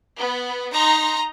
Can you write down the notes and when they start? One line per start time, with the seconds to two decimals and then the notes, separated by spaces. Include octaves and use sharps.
0.17 B3
0.72 D#4 A#5 C6